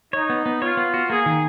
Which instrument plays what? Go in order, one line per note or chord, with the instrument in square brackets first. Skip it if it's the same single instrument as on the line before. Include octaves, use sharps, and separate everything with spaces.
[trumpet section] D#4 [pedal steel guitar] C#5
[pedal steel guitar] B3
B3
[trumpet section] F4 [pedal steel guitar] C#5
[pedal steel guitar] B3
F#4
[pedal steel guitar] A#3 [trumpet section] G#4
[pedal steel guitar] D#3